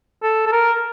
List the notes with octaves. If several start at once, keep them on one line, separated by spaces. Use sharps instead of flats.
A4
A4
A#4